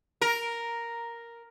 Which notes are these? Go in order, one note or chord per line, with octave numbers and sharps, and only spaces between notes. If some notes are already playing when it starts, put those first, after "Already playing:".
A#4